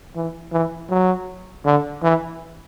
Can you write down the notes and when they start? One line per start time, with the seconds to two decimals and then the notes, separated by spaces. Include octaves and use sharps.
0.16 E3
0.52 E3
0.90 F#3
1.65 D3
2.03 E3